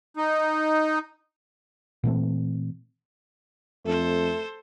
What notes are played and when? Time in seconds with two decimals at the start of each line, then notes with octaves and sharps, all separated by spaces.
0.17 D#4
2.04 A#2 E3 A3 C4
3.86 F2 A3 A4 C5